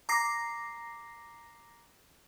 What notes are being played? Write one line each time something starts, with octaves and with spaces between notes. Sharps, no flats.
A#5 D6 A#6 C7